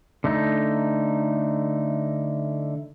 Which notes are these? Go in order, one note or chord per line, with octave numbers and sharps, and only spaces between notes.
D3 A3 D#4